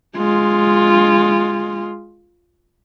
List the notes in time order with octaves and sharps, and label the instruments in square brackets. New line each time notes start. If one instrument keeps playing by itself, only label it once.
[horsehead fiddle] G#3 F4